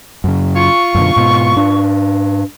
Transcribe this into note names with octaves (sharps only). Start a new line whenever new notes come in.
F#2 C#3
F4 C#6
F#2 B2 D3
G#2 B2
G#2 D4